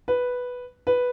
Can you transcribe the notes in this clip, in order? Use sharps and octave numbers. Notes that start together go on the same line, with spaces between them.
B4
B4